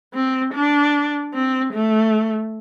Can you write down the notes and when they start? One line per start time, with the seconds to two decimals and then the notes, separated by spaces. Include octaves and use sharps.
0.14 C4
0.54 D4
1.34 C4
1.74 A3